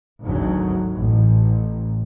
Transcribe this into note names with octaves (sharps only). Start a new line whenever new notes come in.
G#1 D2 G#2 F#3
A1